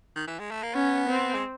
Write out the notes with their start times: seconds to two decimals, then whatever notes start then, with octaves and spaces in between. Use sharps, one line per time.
0.16 D#3
0.27 E3
0.39 G#3
0.51 A3
0.63 A#3
0.74 B3 C#4
1.09 C4
1.34 G#3